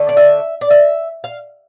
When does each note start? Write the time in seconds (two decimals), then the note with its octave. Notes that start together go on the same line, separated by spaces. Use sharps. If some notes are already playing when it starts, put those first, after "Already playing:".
Already playing: D3 A3
0.09 D5
0.17 E5
0.61 D5
0.70 E5
1.24 F5